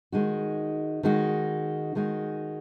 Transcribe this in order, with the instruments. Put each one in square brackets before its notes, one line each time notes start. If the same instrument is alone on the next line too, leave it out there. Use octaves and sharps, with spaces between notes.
[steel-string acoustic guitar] D#3 G#3 D#4 F#4
D#3 G#3 D#4 F#4
D#3 G#3 D#4 F#4